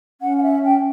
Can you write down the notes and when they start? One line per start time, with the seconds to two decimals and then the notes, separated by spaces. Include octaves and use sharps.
0.21 C#4 F#5
0.37 F#5
0.43 E5
0.65 G5